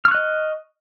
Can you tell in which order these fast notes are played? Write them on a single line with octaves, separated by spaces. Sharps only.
F6 C#6 F#6 D#5